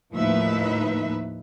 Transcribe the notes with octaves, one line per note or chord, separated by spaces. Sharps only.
D#2 A2 F3 D#4 B4 E5